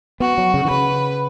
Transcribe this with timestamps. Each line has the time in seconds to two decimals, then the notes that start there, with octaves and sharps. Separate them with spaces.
0.20 B3 F#4
0.38 F#3
0.54 C#3
0.65 E3
0.70 C#3 B4